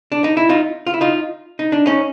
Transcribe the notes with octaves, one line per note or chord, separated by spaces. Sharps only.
D4
D#4
E4
D#4 F4
F4
E4
D#4 F4
D#4
D4
C#4 D#4